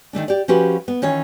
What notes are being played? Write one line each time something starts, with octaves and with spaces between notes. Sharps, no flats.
D#3 E3 A3 D4
G4 D5
F3 C#4 F#4 G4 B4
B3
D#3 E3 C#4 F4 C#5